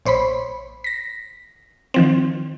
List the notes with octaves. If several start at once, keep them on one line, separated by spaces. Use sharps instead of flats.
A#1 C5 C#5 B5 C6
A#6 B6
D#3 F3 C4